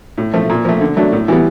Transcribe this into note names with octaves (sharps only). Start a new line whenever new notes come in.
A2
F3 A3
A#2
F3 A3
D3
F#3 A3 D4
A2
E3 G3 B3